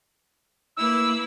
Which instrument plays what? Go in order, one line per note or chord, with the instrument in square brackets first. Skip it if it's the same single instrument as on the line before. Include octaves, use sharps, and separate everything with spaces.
[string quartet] A#3 E4 B4 [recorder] E6